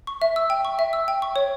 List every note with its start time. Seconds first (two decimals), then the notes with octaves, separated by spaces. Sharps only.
0.07 C#6
0.22 E5
0.36 E6
0.50 G5
0.65 C#6
0.79 E5
0.93 E6
1.08 G5
1.22 C#6
1.36 C#5